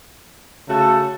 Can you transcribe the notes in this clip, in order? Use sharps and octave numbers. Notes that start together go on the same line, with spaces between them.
C#3 A3 F#4 A4